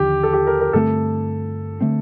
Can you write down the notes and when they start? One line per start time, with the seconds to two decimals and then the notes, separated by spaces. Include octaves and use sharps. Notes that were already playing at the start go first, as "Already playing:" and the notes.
Already playing: D#2 D3 F3 G4
0.23 A4
0.33 G4
0.47 A#4
0.60 A#4
0.73 G2 D3 A3 C4 A4
1.81 D3 A3 C4